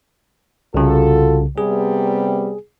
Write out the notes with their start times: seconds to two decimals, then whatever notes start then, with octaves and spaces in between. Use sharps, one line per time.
0.74 C2 C#3 F4 F#4 A4
1.58 C3 G3 B3 G#4